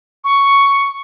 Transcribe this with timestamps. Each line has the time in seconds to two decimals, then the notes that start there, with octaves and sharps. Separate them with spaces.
0.24 C#6